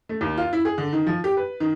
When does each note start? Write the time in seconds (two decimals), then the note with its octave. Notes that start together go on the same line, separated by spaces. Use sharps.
0.09 A3
0.21 D#2
0.37 F4
0.53 E4
0.65 G#4
0.78 D3
0.93 D#3
1.07 F3
1.24 G4
1.37 B4
1.60 D#3